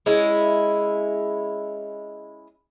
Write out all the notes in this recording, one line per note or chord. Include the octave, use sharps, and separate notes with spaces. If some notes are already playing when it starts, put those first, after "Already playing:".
G#3 C#4 E4